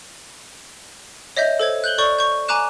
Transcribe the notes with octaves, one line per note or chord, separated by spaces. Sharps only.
C#5 D#5 E5 G6
A4 C5 G#6
F#6 G6 F#7 G7
A4 D5 C#6 G6
C#6 G6
G#5 A#5 D6 F#6 E7